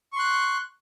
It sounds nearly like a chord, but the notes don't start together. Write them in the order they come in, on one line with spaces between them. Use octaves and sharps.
C#6 C6 F#6